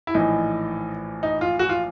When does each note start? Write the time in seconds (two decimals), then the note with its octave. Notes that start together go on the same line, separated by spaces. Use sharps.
0.07 E4
0.14 A#1 A2 E3 D#4
1.23 D#4
1.41 F4
1.59 F#4
1.69 F4